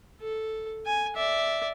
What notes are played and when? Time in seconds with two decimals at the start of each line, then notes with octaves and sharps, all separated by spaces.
0.21 A4
0.86 G#5
1.16 D5 E5